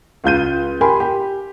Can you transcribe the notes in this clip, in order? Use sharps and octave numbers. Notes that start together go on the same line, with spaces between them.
C#2 F4 G6 D#7
G4 A#4 G#5 B5 C6
G4